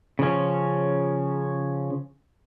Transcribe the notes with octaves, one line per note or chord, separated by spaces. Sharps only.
C#3 F3 C#4